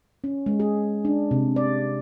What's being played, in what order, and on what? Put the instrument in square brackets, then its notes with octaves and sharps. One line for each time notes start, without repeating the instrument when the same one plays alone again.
[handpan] C#4
G#3
G#4
D4
C3
D5